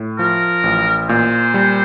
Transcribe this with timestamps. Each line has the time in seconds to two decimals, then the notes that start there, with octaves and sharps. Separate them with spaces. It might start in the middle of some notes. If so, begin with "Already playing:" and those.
Already playing: A2
0.19 F3 A#4
0.64 A1
1.09 A#2 C5
1.54 G3